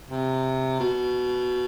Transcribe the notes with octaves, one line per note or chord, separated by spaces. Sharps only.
C3
B2